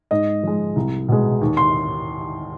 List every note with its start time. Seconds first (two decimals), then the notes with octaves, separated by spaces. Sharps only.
0.11 G#2 D#5
0.43 F3 G#3
0.76 C2
1.08 B2 G#3
1.41 D#2
1.57 C6